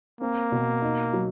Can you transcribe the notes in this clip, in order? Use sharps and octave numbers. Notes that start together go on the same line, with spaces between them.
A#3 C4
B2
D#4
F#3